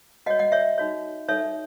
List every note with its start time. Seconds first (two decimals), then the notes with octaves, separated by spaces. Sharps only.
0.26 F#4 D#5 F#5
0.30 C#5
0.39 D#5 F#5
0.52 C#5 E5
0.78 D#4 F#4 C#5
1.28 D#4 A4 C#5 E5